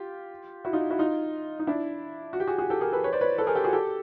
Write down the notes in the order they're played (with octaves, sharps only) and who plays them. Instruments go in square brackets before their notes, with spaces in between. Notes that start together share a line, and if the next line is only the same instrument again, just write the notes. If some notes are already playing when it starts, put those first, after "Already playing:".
Already playing: [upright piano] F4 G4
E4 F#4
D#4 F4
E4 F#4
D#4 F4
D#4
D4 E4
F#4
G4
F#4 G#4
F#4 G#4
G4 A4
G#4 A#4
A4 B4
B4 C#5
C5 D5
B4 C#5
A4 B4
G#4 A#4
G4 A4
F#4 G#4
G4 A4